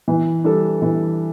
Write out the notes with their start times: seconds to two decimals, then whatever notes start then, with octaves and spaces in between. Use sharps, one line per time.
0.08 E3
0.44 G3 D4 A4
0.82 E3